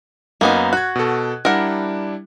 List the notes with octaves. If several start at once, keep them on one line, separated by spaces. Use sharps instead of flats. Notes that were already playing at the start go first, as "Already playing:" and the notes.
F#2 A#3 B3 D#4
F#4 F#6 G#6
B2 A4
G3 D4 E4 A#4 F#5